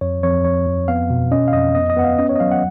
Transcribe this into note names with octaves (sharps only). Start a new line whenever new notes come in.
F2 C#5
F2 C#5
F2 C#5
F2
B3 F5
B2
C#4 D#5
F5
F2 D#5
B3 D#5
D#5
B3 F#5
F5
C#4 D#5
C#5
D#5
F#3 F5
F#5